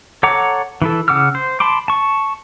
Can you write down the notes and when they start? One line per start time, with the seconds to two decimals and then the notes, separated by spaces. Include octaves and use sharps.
0.23 A4 C#5 F#5 A#5 D6
0.82 E3 E4 A4
1.08 C#3 F#5 D6 E6 F6
1.35 C5
1.60 A5 B5 C6 D6
1.88 A5 C#6